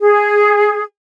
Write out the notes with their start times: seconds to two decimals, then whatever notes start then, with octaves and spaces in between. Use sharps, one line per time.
0.01 G#4